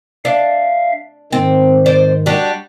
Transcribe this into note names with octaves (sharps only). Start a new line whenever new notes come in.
D4 E5 F5
G#2 D#3 G#3 C4
C5 D5
G3 D4 F#4